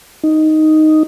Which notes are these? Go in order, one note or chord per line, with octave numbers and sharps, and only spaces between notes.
D#4